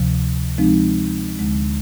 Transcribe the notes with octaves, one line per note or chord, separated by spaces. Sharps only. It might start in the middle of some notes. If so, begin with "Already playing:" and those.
Already playing: D2 C3 F3
F3 G#3 C4 D#4
D2 D3 G#3